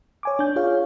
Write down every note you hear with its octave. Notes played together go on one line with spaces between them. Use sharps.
C#5 G#5 D6
D4 G6
F4 G#4 C#5 F5